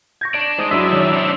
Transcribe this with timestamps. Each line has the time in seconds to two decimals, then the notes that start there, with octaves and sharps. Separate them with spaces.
0.21 C#6 G6 G#6 A#6
0.34 D5 A5 D7
0.58 G#3 D#4 C5 A5 D#6
0.71 F#2 F#3 D4 E4 E5 E6 B6
0.92 D#3 C#5
1.14 C#4 C5